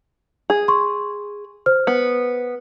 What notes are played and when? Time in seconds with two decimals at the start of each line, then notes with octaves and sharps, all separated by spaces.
0.50 G#4
0.68 C6 C#6
1.66 C5 F6
1.87 B3